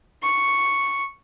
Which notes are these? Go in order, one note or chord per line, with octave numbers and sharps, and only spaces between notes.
C#6